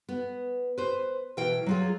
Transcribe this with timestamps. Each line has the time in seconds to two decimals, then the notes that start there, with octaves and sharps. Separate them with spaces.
0.09 B3
0.78 B4 C5
1.37 B2 E3 A#4 G5
1.66 F#3 F4 G#4